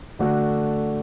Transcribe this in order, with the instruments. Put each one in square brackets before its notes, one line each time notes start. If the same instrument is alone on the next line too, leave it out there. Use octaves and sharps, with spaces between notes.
[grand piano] D3 A3 D4 F#4